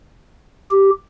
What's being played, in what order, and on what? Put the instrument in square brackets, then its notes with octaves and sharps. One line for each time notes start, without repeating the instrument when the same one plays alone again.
[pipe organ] G4